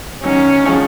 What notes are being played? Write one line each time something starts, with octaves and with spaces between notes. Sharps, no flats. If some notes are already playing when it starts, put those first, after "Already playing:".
D#3 F#3 C#4
F3 G#3